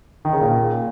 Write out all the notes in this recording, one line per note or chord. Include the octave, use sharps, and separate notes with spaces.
D#3
C#3
A#2